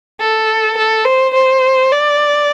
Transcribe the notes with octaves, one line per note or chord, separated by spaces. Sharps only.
A4
A4
C5
C5
D5